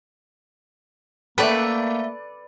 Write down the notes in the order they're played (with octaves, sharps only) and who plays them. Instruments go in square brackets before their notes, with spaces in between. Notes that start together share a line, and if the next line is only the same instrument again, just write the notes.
[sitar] A3 E5 [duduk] A#3 [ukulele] A4 [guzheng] B4 D5